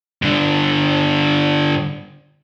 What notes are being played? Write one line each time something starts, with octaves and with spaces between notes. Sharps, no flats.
G2 D3